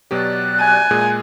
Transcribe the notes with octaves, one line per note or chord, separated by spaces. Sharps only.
B2 F#3 G4 D5 F#6
G#5
A#2 G#3 G#4